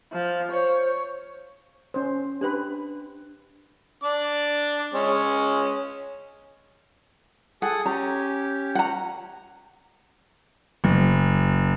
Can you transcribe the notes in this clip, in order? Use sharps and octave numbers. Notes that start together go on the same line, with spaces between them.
F3
C5 C#5
C#4 C5
D4 G4 B4 C5 C6
D4 D6
G#3 C#4
G#4 A4 F#5 D#6
C#4 G4 A#5
F#5 A#5
F#1